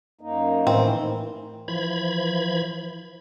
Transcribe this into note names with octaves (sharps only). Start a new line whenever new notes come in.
F#2 A#3 D#4
A2 D#3 E3 C4
E3 F3 B5 G#6